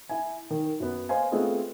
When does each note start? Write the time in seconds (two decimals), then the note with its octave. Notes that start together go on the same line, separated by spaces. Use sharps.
0.09 E4 G#5
0.50 D#3
0.80 F#2 B3
1.09 C5 D#5 F5 G#5
1.32 A3 B3 C4 F4 G#4 D#5